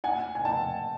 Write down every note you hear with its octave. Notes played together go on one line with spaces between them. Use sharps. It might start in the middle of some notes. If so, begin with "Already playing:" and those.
F#5 G#5
G#5
G5 A5